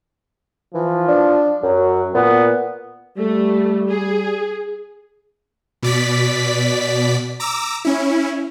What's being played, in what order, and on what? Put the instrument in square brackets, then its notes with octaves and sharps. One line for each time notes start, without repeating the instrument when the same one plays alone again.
[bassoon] E3 [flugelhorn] F3
[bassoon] D4
[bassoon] F#2 [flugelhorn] F#3
[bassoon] A#2 [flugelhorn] B3
[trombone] G3 [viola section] A3
[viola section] G#4
[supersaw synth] B2 D5 B6
A#5 D6 E6
C#4 E4